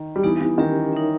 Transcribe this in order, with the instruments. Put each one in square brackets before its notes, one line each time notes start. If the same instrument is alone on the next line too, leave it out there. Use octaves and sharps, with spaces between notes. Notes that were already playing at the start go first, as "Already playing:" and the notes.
Already playing: [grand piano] D#3
G3
[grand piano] E3 [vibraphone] B3 D#4 G4
[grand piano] E3
[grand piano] D#3 [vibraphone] C#4 G4 A#4
[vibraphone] D#4 A#4 C#5 E5